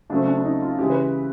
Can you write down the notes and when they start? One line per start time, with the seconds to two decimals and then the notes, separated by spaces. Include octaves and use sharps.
0.10 C#3 F#3 A3 C4 D4
0.28 D4
0.38 D4
0.45 D#4
0.62 F4
0.78 C#3 E3 G#3 G4
0.90 B4